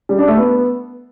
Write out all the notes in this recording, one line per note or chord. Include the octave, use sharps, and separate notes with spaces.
G3
D4
A3
B3